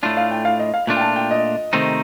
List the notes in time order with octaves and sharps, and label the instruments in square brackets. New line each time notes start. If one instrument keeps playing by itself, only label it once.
[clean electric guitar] A2 A3 D4 F4 [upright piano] A5
[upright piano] F5
G5
F5
D#5
F5
[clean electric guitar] A#2 A3 D4 F4
[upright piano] G5
A5
G5
D#5
[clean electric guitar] C3 D#3 A3 C4 D#4